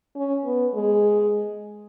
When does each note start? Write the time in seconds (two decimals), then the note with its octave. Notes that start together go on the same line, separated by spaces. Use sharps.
0.16 C#4
0.45 B3
0.75 G#3